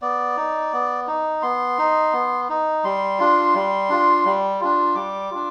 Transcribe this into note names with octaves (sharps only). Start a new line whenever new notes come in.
B3 D5
D#4
B3
D#4
B3 C6
D#4
B3
D#4
G3 C6
D4 F4
G3
D4 F4
G3
D4 F4
G3 D6
D4 F4